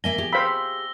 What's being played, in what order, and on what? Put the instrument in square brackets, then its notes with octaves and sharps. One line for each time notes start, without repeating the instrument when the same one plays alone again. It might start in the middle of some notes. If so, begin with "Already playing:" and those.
[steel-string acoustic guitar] A#3 E5 G#5 [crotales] A#6 G7
[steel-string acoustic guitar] G4 G#4
[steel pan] C5 F5 B5 [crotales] E6